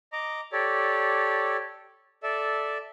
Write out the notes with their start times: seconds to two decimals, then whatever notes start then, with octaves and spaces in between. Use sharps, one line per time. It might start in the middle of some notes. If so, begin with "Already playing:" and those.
0.13 D#5 A#5 D6
0.53 G4 A4 C#5 D5
2.23 A4 D5 E5